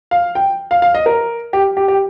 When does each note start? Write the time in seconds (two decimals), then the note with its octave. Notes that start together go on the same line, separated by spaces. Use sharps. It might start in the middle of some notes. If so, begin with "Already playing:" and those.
0.11 F5
0.35 G5
0.71 F5
0.82 F5
0.94 D#5
1.06 A#4
1.53 G4
1.77 G4
1.88 G4